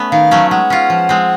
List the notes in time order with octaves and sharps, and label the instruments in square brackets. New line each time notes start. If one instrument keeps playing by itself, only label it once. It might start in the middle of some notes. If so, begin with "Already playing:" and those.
Already playing: [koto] A3 B3 C#4
[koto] D#3 [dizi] F5
[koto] F#3 A3 C#4
[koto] G#3 [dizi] F#5
[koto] C#4 F4
F3
G#3 C4